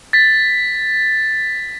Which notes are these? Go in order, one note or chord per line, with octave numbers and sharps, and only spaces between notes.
A6 B6